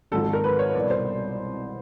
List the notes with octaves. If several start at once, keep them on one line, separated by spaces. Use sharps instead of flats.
G#1 G#2 F3 A4
A#4
B4
C#5
C2 B2 G3 D5
C5